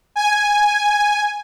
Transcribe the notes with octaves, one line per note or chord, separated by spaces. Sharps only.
G#5